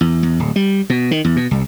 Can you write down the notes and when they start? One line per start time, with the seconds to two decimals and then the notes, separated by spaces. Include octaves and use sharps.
0.01 E2
0.23 E2
0.39 D1
0.56 G3
0.90 B2
1.11 D#3
1.25 E2
1.36 B2
1.51 C2